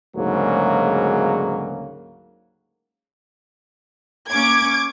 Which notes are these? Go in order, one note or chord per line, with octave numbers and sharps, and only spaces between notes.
D2 G#2 C#3 F#3 A#3
A#3 C#4 D6 G#6